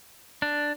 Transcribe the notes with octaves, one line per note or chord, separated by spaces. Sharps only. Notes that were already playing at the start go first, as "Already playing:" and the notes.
D4